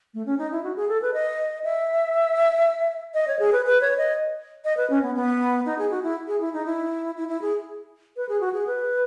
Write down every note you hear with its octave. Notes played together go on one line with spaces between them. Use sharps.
A3
C#4
D#4
E4
F#4
G#4
A4
B4
D#5
E5
D#5
C#5
G#4
B4
B4
C#5
D#5
D#5
B4
C#4
B3
B3
D#4
G#4
F#4
E4
G#4
E4
D#4
E4
E4
E4
G#4
B4
G#4
F#4
G#4
B4